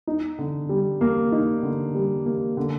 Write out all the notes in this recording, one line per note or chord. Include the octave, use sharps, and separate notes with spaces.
D#4
D3
G3
A#3
D#4
D3
G3
A#3
D3